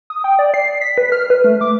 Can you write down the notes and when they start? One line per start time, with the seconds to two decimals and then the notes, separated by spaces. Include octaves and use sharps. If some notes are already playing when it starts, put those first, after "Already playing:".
0.10 D#6
0.24 G5
0.39 D5
0.54 C7
0.81 B6
0.98 B4
1.12 F6
1.30 B4
1.44 A3
1.61 D6